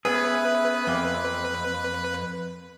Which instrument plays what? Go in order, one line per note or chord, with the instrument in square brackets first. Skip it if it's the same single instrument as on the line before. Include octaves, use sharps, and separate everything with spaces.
[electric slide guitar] B3 C#4 G#4 [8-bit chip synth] B4 [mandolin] E5
[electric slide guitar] F2 [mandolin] A#3 C4